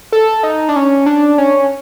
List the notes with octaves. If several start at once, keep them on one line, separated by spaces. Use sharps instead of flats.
A4
D#4
D4
C#4
D4
C#4